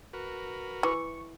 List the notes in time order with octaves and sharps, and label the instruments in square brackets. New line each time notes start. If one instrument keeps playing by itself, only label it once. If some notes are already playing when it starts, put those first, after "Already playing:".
[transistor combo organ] F#4 A#4 B4
[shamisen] E3 [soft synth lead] C#6